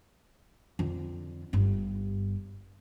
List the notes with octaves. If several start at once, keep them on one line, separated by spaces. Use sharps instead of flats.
F2 D3
G1 G2